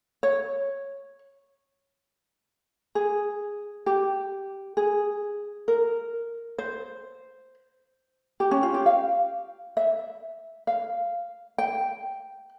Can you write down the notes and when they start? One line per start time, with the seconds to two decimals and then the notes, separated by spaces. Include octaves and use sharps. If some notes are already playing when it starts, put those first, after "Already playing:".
0.23 C#5
2.95 G#4
3.86 G4
4.77 G#4
5.68 A#4
6.58 C5
8.40 G4
8.51 C#4
8.63 F4
8.74 G4
8.86 F5
9.77 E5
10.67 F5
11.58 G5